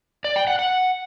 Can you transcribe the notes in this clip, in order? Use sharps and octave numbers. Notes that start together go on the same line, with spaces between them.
D5
G5
F#5
F#5